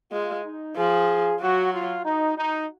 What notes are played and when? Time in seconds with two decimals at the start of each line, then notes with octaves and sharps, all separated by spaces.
0.12 G#3 F4
0.44 D#4
0.76 F3 G#4
1.41 F#3 F#4
1.72 F4
2.04 D#4
2.37 D#4